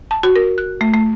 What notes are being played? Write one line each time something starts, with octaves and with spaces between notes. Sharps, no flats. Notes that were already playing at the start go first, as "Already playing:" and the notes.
A5
F#4
A#4
F#6
A3
A3